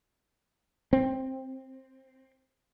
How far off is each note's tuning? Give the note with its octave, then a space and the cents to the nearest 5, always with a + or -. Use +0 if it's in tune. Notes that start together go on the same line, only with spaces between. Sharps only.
C4 +10